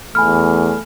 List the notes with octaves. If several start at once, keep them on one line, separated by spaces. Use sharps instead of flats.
E2 A3 G#5 B5 F6